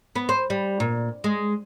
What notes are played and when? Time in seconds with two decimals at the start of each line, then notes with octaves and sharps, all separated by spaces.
0.15 B3
0.29 C5
0.50 G3
0.80 A#2
1.24 G#3